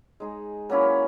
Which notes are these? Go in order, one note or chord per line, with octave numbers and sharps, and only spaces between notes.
G#3 D#4 G#4
F#3 A#3 C#4 E4